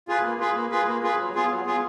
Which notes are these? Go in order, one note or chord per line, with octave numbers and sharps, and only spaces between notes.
F4 G#4 B4
A#3
F4 G#4 B4
A#3
F4 G#4 B4
A#3
F4 G#4 B4
F#3
B3 F4 G#4
F#3
B3 F4 G#4